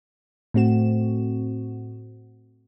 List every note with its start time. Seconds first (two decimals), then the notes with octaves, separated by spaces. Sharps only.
0.54 A2 A3 C4 F#4 E7